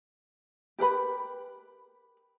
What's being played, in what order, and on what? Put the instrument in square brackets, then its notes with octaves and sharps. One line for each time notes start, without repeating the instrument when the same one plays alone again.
[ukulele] G4 A#4 B4 B5